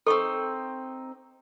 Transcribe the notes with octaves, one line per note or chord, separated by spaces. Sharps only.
C4 D#4 A4 C#6